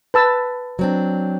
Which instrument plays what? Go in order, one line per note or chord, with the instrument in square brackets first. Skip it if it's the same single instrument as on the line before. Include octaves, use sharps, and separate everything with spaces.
[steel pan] B4 A5 E6
[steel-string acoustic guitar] F#3 C4 D4